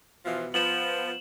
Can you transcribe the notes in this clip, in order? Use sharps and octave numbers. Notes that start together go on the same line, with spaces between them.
B2 E3 F3
F3 B3 E7 F#7